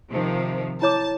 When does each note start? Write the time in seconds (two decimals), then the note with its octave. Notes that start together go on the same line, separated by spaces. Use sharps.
0.11 C3 D#3 F3
0.82 E4 C#5 A5 D6